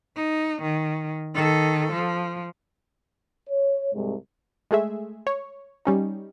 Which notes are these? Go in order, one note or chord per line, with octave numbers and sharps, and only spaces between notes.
D#4
D#3
D#3 A4
F3
C#5
C2 G#2
G#3 A3 G#4 E5
C#5
G3 C#4 D#4